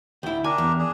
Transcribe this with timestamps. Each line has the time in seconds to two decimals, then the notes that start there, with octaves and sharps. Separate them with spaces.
0.23 D2 E4 G5
0.44 D4 G4 A#4 G#5
0.58 E2
0.79 D4 G#4